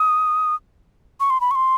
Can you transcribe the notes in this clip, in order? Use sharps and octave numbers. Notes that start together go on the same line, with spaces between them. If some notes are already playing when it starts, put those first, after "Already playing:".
Already playing: D#6
C#6
C6
B5
C#6
C6